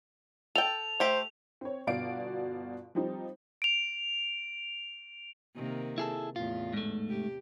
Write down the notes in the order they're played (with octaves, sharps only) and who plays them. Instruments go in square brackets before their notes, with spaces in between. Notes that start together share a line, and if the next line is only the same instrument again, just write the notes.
[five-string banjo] A4 G5 [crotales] F7
[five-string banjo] A3 G4 [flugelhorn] C5
[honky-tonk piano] C4 C#5
G1 B2 F#4 D5 F5 D7
F3 G3 C4 D#4
[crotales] D7 F7
[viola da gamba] C3 D#3 A#3
[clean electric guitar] E4 G#4 A4
[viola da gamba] E2 A2 [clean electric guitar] F4
[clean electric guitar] G#2 A3
[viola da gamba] C3 G4